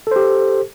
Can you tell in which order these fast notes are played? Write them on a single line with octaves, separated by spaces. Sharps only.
A4 C5 G4